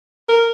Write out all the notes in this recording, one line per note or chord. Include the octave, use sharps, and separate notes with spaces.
A#4